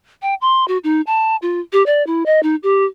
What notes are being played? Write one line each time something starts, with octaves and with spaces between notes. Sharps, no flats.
G5
C6
F#4
D#4
A5
F4
G4
D5
E4
D#5
D#4
G4